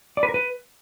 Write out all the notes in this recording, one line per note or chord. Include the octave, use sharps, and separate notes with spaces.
D5
B4
A#4
B4